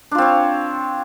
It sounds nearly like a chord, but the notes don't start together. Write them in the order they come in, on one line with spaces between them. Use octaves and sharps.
D4 F4 C4 C#5